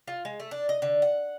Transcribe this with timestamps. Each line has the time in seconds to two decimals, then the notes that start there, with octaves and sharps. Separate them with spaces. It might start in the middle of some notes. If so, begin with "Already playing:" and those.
0.08 F4
0.25 G#3
0.40 A3
0.51 D4
0.69 D#5
0.82 D3
1.02 F#5